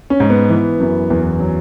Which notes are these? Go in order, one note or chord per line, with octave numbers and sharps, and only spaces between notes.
C#4
G#2
B3
E3
F#2
E2
F#3